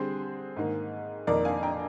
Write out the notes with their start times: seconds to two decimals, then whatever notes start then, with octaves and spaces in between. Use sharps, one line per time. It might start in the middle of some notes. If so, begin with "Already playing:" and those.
Already playing: D3 G3 C4 G#4 C5
0.56 G#2 D#3 A#3
1.27 F2 D#3 A#3 A#4 D5
1.45 F5 G#5
1.63 G5 A#5